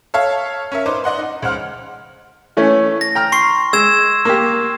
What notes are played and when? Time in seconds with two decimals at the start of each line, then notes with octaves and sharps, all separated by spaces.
0.14 A4 C#5 E5 F5
0.72 C#4 A#4 E5
0.86 D#4 B4 C5 D6
1.04 D5 D#5 F#5 C6
1.19 D#4
1.42 C#2 C5 F#5 F6
2.57 E3 A3 C#4
3.01 A#6
3.15 G5 A#5 F6
3.32 C6 C#6 C7
3.73 G#3 E6 G#6 E7
4.25 A#3 G4